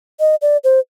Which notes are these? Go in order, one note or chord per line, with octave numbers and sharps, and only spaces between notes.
D#5
D5
C5